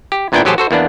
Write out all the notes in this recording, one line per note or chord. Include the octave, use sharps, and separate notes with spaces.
G4
G#1 A#2 B3 D4 E4 G5
A1 F#3 G4 G#4 C5 A5
F#4 A4 C5
E2 A#3 B3 D4